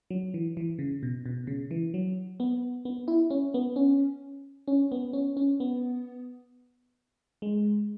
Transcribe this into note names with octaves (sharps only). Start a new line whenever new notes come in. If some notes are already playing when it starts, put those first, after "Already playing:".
F#3
E3
E3
C#3
B2
B2
C#3
E3
F#3
B3
B3
E4
C#4
B3
C#4
C#4
B3
C#4
C#4
B3
G#3